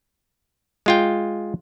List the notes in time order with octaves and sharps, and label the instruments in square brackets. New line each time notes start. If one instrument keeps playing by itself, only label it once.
[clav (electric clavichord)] G#3 F4 G5